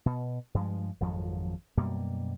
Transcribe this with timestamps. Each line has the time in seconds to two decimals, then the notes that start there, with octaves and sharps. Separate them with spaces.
0.06 B2
0.54 G2 F3 G#3
1.00 G#1 F2 F3 F#3
1.77 F#2 B2 G3 A#3